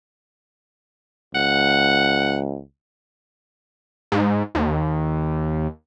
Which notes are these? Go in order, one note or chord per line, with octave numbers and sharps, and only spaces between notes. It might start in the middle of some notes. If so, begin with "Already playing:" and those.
C#2 F#5
G#2
D#2